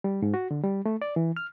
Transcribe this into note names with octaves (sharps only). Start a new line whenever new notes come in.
G3
G#2
F#4
D3
G3
A3
D5
E3
F6